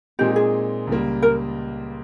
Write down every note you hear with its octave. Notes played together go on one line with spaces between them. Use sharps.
A#2 G#3 C4 D#4 G4
G#4
C#2 C#3 G3 A#3
A#4